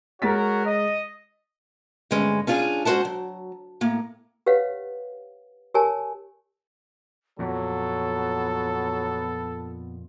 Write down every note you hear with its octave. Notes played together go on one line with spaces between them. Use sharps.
G#3 F#4 A#4 C#5 A6 B6
D#5
D2 G2 G#3 C#4
C#4 D4 F4 G4 G#4
G#3 C#4 F#4 C5 F#5 A5
F#3
A2 A#3
G4 B4 C#5 F5 F#5
G4 A#4 C#5 G#5 A5
F2 A#2 F#3 B3 A4